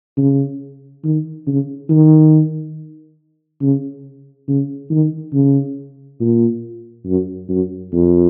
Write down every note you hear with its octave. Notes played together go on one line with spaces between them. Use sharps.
C#3
D#3
C#3
D#3
C#3
C#3
D#3
C#3
A#2
F#2
F#2
F2